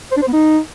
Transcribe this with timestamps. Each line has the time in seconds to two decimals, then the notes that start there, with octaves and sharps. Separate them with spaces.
0.11 C5
0.17 D4
0.22 C5
0.27 B3
0.33 D#4